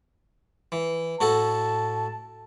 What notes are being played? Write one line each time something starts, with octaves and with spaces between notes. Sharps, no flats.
E3
A2 F#4 A4 A5